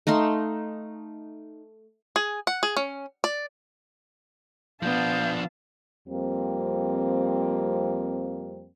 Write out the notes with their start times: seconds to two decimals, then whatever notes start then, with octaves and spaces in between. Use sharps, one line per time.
0.07 A3 D#4 F5 C6
2.16 G#4
2.47 F#5
2.63 G#4
2.77 C#4
3.24 D5
4.83 F3 B3 D4 F5 A5 G6
6.08 F2 G3 A#3 C4